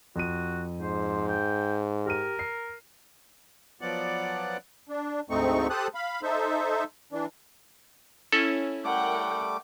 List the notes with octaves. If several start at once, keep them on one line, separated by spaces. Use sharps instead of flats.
F2 F#4 D#7
G#2 C5
G5
G4 A#4 F6 D#7
C7
F3 F#3 B3 D5 F#5
D4
D2 G#2 A3 C4 D#4 C#6
G4 A4 C5 A5 D#6 F#6
F5 B5
D#4 A4 C5 E5
E3 D4
C#4 E4 A4
G3 A3 A#4 F#5 G5 D6